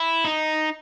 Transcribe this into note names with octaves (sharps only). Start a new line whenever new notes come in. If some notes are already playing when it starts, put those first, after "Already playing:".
Already playing: E4
D#4